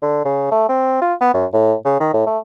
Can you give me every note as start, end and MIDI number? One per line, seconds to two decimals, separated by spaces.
0.02 0.20 50
0.25 0.51 49
0.52 0.65 57
0.69 1.00 60
1.02 1.14 65
1.21 1.34 59
1.34 1.46 42
1.53 1.75 45
1.85 1.99 49
2.00 2.11 51
2.14 2.23 45
2.27 2.38 57